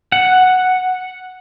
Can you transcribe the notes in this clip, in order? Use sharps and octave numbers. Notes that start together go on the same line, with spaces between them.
F#5